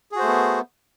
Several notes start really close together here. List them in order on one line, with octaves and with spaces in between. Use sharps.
G#4 F#4 C5 A3 B3